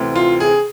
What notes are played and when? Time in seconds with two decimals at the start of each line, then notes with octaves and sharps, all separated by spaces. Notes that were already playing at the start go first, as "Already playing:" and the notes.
Already playing: D2 C3 E3
0.16 F4
0.40 G#4